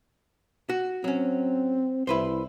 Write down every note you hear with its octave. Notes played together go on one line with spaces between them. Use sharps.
F#4
F#3 C4 C#4
C2 E4 B4 C5